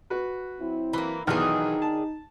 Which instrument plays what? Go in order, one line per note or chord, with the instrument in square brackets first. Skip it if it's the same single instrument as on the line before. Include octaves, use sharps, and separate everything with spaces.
[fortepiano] F#4 B4
[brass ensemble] F#3 C4 E4
[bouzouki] E3 A#3 [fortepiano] B5
[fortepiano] B1 E3 F6 [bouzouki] D#3 D4 G#4 [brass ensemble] D#4
[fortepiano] A5